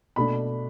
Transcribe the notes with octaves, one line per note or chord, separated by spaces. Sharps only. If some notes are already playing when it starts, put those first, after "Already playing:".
B2 A3 D4 B5